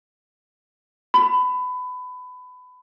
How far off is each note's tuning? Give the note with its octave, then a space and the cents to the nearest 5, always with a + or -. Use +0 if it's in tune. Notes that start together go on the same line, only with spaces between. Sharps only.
B5 +25